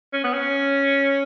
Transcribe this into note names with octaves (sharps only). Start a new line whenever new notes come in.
C#4
B3
C#4